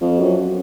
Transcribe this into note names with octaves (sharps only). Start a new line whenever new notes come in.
F2
F#2